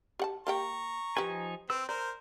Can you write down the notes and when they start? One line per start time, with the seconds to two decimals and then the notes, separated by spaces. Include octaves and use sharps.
0.19 G4 F#5 A5
0.47 A#3 G4 G5 A#5 C#6
1.17 F3 D#4 G4 B4 G#5
1.70 C4 B4 E6
1.89 A#4 C5 D5 G6